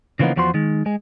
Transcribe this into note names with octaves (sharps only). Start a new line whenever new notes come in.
C#3 E3 F3 A#3 B3 D#4
E2 F3 F#4 C5 C6
D#3 G#3
G#3 G#4